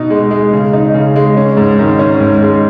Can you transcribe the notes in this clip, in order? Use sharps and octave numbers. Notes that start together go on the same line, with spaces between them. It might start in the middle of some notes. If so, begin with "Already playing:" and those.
Already playing: B2 D#4
G#3
G#3
C#3
D#4
C#3
G#3
C#4
G#2
D#3
C#4
G#2
G#3